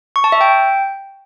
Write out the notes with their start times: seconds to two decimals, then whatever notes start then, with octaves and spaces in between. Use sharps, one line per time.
0.16 C#6
0.24 A5
0.32 E5
0.41 G5